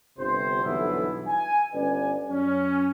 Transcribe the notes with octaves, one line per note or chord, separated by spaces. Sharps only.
G1 C3 C5
B1 G2 D3 E3 B3 E4
G#5
G1 C#4 B4 D5 G#5
F#2 C#4